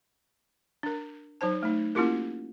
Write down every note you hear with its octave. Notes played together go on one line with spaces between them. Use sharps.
D4 A#4
F#3 D#4 C5 A5
A3 D#4
A#3 C#4 E4 F4 G4 A#4